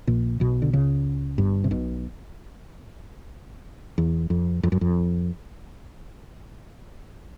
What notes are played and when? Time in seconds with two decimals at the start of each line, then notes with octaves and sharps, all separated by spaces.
0.07 A#1 A#2
0.40 B1 B2
0.62 D3
0.73 C#2 C#3
1.38 G1 G2
1.64 C3
1.71 B1 B2
3.98 E2
4.30 F2
4.63 F2
4.72 F#2
4.81 F2